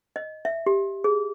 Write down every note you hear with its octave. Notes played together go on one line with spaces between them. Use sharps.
D#5
E5
G4
G#4